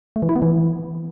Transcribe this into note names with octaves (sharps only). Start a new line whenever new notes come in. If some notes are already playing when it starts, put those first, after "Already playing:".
A3
E3
E4
B3
E3